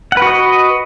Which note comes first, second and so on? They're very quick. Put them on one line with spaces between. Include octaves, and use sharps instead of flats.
F#5 B4 F#4 D#5